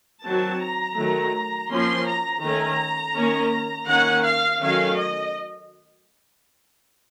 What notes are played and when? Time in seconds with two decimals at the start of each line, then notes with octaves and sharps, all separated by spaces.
0.24 D#3 F#3 C4 A5
0.61 A#5
0.97 D#3 F#3 A3
1.70 F3 A#3 C#4 C6
2.06 A#5
2.42 D#3 A3 C#4 A#5
3.15 D#3 A#3 C#4
3.88 D#3 A#3 C#4 F#5
4.24 F5
4.60 D#3 F#3 A3 C#4 F5
4.97 D#5